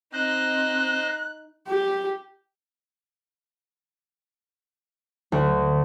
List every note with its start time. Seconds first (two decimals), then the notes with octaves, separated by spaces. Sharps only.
0.13 C4 D#4 C5 D#5 F#6
1.69 G4
5.32 D2